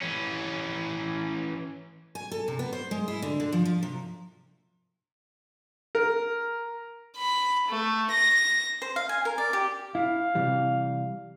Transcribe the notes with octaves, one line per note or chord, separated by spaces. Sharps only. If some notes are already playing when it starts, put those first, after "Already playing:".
E3 C#4
G#5
A4
C3
B3
C5
G#3
E4
D3
D3
F3
F3
C3
A#4
B5
A3
A#6
C5
F5
G#5
A#4
D5
G4
E4 F5
C3 E3 G3